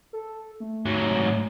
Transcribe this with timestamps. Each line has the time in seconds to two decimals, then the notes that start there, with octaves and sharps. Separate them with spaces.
0.13 A4
0.60 A3
0.86 G#2 F#3